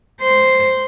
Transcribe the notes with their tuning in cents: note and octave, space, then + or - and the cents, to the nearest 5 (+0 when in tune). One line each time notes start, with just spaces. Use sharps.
C5 -5